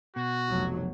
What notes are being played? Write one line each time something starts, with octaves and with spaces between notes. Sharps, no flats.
B2 F#4
F1 B1 F#3